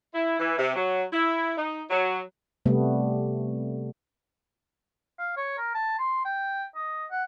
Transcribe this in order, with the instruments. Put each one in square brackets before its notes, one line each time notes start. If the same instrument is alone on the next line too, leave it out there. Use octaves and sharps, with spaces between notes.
[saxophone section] E4
E3
C3
F#3
E4
D#4
F#3
[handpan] C3 G3 A3 B3
[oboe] F5
C#5
A#4
A5
C6
G5
D#5
F#5